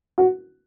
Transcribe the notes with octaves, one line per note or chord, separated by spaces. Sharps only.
F#4